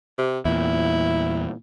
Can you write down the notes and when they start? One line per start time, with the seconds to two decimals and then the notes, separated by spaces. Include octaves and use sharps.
0.18 C3
0.45 E2 A#2 E4